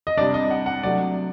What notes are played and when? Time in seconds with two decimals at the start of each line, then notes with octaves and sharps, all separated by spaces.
0.07 D#5
0.17 C3 G3 D4 D5
0.34 D#5
0.51 F#5
0.66 F#5
0.83 C3 F#3 A3 D4 D5